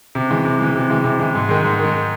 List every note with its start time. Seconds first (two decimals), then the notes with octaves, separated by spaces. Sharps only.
0.15 C3
0.31 E3 G#3
0.45 C3
0.60 E3 G#3
0.76 C3
0.90 E3 G#3
1.04 C3
1.19 E3 G#3
1.35 G#2
1.49 D#3 G#3
1.65 G#2
1.79 D#3 G#3